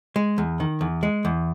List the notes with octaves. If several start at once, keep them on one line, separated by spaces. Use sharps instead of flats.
G#3
E2
D#3
E2
G#3
E2